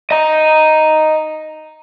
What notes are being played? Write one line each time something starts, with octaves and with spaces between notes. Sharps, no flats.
D#5 A#5